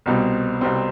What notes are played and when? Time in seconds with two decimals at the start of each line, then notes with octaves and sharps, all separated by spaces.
0.06 C2 B2 G3 C4
0.61 C2 B2 G3 C4